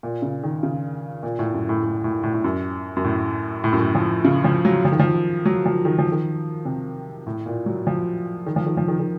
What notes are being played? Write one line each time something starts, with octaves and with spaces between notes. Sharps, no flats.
A#2
C#3
D#3
C#3
A#2
A2
F#2
A2
A2
A2
A2
A2
F#2
F#2
A2
A2
F#2
A2
F3
C#3
F3
F#3
F3
D#3
F3
F#3
F3
D#3
F3
D#3
C3
A2
A#2
F#3
F3
D#3
F3
D#3
F3
D#3
D#3